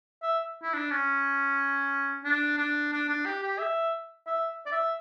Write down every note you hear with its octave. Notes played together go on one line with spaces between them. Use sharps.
E5
E4
D4
C#4
D4
D4
D4
D4
G4
G4
E5
E5
D5
E5